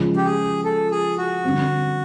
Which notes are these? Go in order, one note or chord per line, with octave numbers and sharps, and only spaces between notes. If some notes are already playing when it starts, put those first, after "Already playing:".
Already playing: C#3 F3 G#3
G4
G#4
A4
G#4
F#4
D3 G3 C4